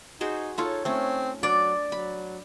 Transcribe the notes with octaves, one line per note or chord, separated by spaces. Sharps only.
D#4 F#4 G#4 C5
D#4 F4 A4 C#5
A3 C4 C#4
F#3 D4 D5
F#3 B5